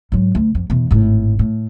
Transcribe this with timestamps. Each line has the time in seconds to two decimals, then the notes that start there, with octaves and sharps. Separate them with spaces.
0.12 G#2 F#3
0.35 D2
0.55 F2
0.70 E2 B2
0.91 G#1 A2
1.39 A2